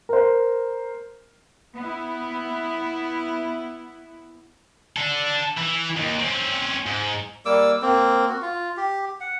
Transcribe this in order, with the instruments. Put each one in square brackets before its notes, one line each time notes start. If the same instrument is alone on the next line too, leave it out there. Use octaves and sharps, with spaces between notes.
[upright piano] A#4 C5
[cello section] B3 E4
[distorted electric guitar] D4 A4
E3
D#2
C4 C#4
G#2
[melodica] G3 A#3 D6 E6
A#3 C4
F#4
F4
G4
F#5